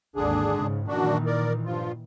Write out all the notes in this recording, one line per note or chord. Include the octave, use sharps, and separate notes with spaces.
G#1 D#2 D3 D4 G#4
G#2 C#3
F#2 A#2 D#3 E3 D4 F#4
A#4 D5
G2 F3 F4